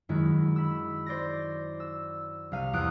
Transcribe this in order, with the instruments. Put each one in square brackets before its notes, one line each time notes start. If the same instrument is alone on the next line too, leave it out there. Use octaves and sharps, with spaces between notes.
[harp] F#2 D#3 G#3 E4
B5 E6
C5 D5 A6 A#6
E6
C2 F5 D#7
E2 D#6 F#6 D7